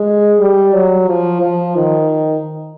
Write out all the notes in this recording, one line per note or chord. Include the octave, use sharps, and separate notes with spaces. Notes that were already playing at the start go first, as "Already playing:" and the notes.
Already playing: G#3
G3
F#3
F3
F3
D#3